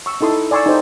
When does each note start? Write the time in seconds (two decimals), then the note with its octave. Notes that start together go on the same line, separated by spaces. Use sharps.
0.06 C#6 E6
0.21 D#4 E4 A4 C6 D#6
0.51 D5 G#5 C6 C#6 E6
0.66 D#4 G4 A4 C5